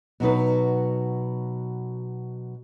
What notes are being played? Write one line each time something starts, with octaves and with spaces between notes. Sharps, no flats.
B2 F#3 D#4 B4